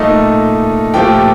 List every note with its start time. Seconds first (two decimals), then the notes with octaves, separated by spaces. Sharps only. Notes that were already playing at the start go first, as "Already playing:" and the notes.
Already playing: A#2 A3 D#4 D#5
0.94 A#2 F3 A3 G4 G5